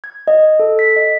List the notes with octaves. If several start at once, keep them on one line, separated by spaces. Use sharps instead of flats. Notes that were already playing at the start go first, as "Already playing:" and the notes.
G#6
D#5
A4
B6
D#5